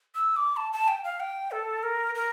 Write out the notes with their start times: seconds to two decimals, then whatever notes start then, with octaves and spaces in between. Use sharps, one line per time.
0.15 E6
0.36 D6
0.56 A5
0.73 A5
0.88 G5
1.04 F5
1.20 G5
1.51 A4
1.83 A#4
2.15 A#4